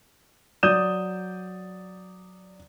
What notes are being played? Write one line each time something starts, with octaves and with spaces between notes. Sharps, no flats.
F#3 D5 D#6 G6 D#7 E7